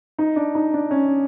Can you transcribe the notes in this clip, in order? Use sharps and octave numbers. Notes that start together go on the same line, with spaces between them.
D#4
D4
D#4
D4
C#4